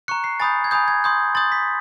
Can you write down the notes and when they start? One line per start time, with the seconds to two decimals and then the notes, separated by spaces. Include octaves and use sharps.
0.08 A#5 C#6 F#6 C#7
0.24 C7
0.40 G#5 B5 D#6 G6 A6
0.64 G#6
0.71 G#5 B5 D#6 G6
0.88 G#6
1.04 C6 D#6 G6
1.35 C6 D#6 G6 A6
1.52 B6